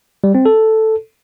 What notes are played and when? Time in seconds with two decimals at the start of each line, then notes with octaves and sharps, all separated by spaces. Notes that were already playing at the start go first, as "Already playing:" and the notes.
0.24 G3
0.35 C4
0.46 A4